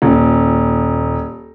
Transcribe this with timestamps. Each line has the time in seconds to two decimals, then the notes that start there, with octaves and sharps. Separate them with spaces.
0.02 D#1